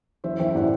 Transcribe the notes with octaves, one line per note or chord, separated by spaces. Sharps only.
E3 C5 E5
E3 E5 G5
A2 D5 F#5